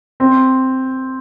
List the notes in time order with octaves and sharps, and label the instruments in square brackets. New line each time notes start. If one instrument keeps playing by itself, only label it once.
[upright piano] C4